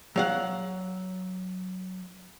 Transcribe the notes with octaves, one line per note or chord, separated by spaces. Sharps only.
F#3 F5 F#5